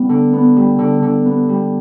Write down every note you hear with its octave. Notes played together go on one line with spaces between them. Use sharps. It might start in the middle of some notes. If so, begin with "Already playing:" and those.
Already playing: G3 B3
D3
B3
G3
D3
D3
B3
G3